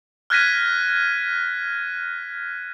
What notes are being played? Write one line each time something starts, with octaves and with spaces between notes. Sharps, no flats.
F6 F#6 G#6 A#6 B6 D#7